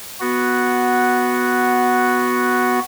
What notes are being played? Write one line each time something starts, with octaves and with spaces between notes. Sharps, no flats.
B3 F#4